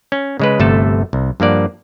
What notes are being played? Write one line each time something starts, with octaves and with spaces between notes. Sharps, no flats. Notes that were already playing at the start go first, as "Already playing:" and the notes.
C#4
C#3 G#3 B4
G1 C3 A3 A4 A5
C2
G2 F3 A#3 D5 F#5